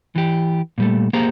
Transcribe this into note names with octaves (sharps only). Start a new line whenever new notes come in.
E3 G4
A#2 G3 A3
A#3 G4 G#4 C5 A#5